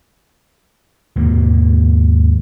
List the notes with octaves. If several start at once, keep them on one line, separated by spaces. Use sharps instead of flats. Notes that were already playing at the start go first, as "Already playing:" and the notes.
D#2 G#2 B2 A#3